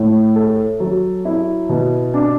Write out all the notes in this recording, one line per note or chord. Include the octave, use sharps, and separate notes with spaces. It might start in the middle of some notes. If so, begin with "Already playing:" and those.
Already playing: A2
A4
F#3
E4
B2
D4